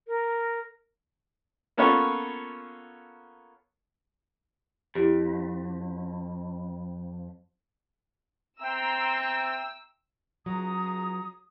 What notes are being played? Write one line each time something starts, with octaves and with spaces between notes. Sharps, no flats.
A#4
A#3 B3 C#4 F4 A4 C#5
F2 E4 G4
C4 E5 G5 A#5 C6 E6
C#2 F#3 A#5 D#6